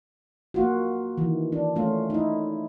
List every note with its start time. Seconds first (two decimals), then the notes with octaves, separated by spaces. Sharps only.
0.54 A#3 F4 F#4
1.18 D#3 E3
1.52 D4
1.76 A3 C#4 F4
2.10 D#4 E4